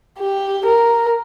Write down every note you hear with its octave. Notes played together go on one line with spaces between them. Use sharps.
G4
A#4